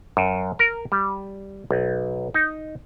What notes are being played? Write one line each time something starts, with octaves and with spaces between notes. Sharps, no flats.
F#2
A#4
G3
B1
D#4